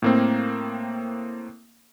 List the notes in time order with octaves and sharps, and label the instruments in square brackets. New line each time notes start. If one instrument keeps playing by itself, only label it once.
[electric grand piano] A2 A#3 C4